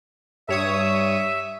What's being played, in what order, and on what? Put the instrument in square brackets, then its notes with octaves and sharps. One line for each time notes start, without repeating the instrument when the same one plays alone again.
[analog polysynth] G2 C#5 D#6 [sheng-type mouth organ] E5